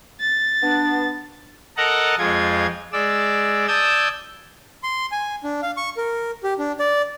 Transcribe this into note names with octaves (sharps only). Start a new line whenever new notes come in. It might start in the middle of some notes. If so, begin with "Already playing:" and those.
A6
B3 D4
A4 A#4 D#5 F#5 A5 A#5
F2 G#3 F4 G#6
G#3 D5 E6
D5 A5 D#6 E6 G6 G#6
C6
G#5
D4
F5
C#6
A#4
G4
D4
D5